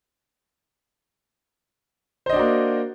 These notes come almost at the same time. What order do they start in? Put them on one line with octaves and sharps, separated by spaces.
C5 D#5 D4 F#4 A#3